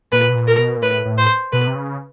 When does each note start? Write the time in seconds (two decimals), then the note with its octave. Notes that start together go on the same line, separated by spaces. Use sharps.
0.12 A#2 B4
0.29 B2
0.35 A#2
0.47 A#4
0.58 B2
0.77 A#2
0.82 A2 B4
1.05 A2
1.18 C5
1.53 B2 B4
1.67 C3
1.75 C#3